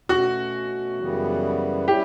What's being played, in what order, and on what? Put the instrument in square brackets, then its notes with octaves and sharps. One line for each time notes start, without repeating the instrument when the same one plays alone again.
[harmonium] B2 A3 C#4 [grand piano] F#4
[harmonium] F#2 C#3 E3 G3 B3
[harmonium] G3 C#4 E4 [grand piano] G4